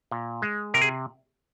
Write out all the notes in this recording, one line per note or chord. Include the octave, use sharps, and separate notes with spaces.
A#2
G#3
C3 A#4
G#4